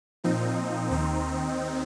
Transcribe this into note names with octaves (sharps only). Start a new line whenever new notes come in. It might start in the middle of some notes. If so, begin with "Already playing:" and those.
A#2 F3 C4 D#4
D#2 D#3 C4 D#4